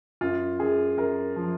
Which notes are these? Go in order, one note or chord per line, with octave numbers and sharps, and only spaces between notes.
F#2 F4
F#2 G#4
F#2 A#4
F3